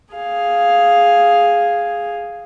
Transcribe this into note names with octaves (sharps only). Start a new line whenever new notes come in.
G#4 F5